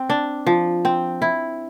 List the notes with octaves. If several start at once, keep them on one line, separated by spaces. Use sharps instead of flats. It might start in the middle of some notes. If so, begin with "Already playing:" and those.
Already playing: C4
D4
F3
C4
E4